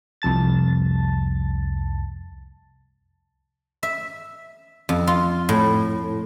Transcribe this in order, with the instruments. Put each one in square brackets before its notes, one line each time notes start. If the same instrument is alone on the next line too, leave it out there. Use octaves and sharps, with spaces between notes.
[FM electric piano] C2 F2 A5 A6
[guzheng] E5
F2
F4
A2